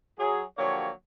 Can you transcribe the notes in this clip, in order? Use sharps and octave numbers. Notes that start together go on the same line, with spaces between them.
F#3 G#4
D3 F3 F#3 A#3 G4 C#5